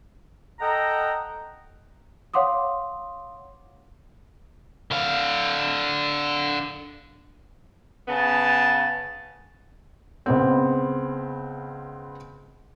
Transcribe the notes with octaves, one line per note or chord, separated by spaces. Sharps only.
A4 D#5 F#5 G5 A#5
C#5 F5 F#5 C6 D6 D#6
D3 F5
C#3 B3 A5
C#2 B3 C4